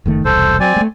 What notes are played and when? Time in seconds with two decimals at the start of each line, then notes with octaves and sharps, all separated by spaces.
0.06 F#1 D#3 A3
0.25 E1 C2 A4 C5
0.60 F#3 C4 D5 G#5
0.76 G#3 A3